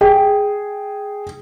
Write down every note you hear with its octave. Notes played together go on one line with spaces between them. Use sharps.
G#4 G5